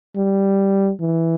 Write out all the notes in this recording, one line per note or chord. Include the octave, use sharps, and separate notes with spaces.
G3
E3